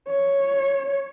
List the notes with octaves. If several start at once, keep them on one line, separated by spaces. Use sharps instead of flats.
C#5